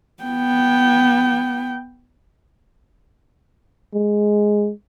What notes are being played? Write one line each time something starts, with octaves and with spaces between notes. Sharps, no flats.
B3 G5
G#3